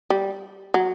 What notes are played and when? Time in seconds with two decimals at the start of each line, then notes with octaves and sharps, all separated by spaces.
0.10 G3
0.74 F#3